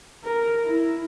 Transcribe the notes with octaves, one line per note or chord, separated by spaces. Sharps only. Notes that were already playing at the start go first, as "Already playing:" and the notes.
A#4
E4